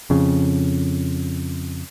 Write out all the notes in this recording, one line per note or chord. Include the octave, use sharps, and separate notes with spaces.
F2 C#3